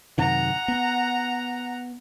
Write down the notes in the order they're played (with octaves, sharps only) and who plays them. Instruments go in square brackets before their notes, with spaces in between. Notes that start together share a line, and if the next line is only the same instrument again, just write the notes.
[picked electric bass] F#2 C3 D#3 [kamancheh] F#5 A#5
[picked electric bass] B3